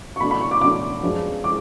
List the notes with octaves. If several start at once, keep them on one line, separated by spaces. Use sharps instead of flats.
C#6
B2 A3 D4 B5
B5
C#6
D6
B2 A3 D4 D6
F#2 F3 G#3 B3 D4
F3 G#3 D6